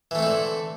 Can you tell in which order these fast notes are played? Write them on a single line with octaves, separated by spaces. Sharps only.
E3 A3 C4 E4 D3